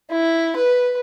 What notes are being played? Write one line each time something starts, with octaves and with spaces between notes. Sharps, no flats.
E4
B4